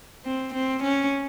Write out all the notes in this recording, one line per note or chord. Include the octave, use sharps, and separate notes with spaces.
C4
C4
C#4